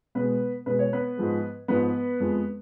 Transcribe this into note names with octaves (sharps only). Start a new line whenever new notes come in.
B2 G#3 B3 B4
B2 G#3 B4
C#5
B3 B4
G#2 F3 G#3
G#2 F3 G#3 B3 B4
F2 F3 G#3